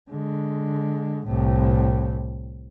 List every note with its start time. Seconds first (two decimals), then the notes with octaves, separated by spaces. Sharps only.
0.10 D3 G#3
1.26 C2 A2